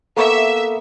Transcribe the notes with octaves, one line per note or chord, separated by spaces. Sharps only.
A#3 B3 A4 E5 C#6